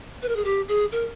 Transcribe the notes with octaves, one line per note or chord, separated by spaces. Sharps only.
B4
A#4
G#4
G4
G#4
A#4